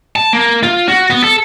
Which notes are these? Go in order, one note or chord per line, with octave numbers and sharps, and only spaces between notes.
A5
A#3
F4
F#4
B3
A4